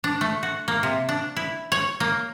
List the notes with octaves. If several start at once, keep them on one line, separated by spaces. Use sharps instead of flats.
D4
A3
F#4
A#3
C3
D4
E4
C#5
A#3